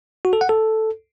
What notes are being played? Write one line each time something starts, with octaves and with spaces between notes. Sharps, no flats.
F#4
A4
F#5
A4